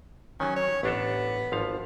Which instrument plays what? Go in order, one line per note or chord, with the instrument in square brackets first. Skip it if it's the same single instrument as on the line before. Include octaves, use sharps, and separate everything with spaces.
[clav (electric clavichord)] D#3 F#3 [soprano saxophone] C#4
[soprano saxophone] C#5
[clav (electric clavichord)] A1 D4 A4 [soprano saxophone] B3
[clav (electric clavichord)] G#1 F3 F5